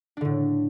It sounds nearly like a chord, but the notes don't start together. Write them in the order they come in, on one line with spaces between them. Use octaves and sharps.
D4 D3 A2